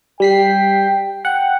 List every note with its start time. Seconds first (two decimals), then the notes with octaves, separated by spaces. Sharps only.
0.20 G3 G5 B6 C7
1.25 F#5 G5